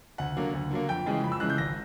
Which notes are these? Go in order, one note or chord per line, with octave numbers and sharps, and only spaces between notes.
D2 F#5
D3 F#3 A#3
D2
D3 F#3 A#3
F2 G5
C#3 E3 G#3
F2 B5
E6
C#3 E3 G#3 F#6
G6
G#1 A#6